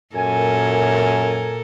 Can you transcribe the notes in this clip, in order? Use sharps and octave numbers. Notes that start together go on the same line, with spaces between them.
F#2 A#2 A4 A#4 G#5